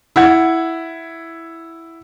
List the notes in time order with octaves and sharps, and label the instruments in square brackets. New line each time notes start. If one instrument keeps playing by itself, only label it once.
[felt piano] E4 F#5 G#6